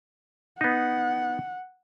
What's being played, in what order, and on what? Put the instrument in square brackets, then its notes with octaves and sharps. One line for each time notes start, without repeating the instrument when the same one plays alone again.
[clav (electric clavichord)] B3 D#4 [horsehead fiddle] F#5